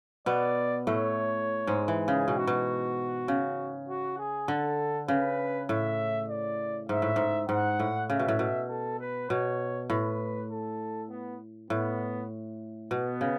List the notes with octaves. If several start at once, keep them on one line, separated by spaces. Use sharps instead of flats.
B2 B3 D5
A2 A3 C#5
G#2 G#3
E3
C#3 G#4
B2
F#4
B2
C#3
F#4
G#4
D3 A4
C#3 B4
A2 E5
D5
G#2 E5
A2
G#2
G#2 F#5
A2
C#3 E5
B2
A2
B2
A4
B4
B2 C#5
A2 B4
A4
B3
A2 B3
B2 B3
C#3